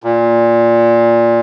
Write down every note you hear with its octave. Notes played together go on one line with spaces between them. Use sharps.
A#2